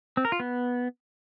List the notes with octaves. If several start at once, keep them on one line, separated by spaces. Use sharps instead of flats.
C4
A#4
F4
B3